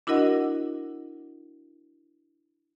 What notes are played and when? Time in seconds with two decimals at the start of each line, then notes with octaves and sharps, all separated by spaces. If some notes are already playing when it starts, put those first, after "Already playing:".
0.07 D4 E4 F#4 A#4 D#5 F#5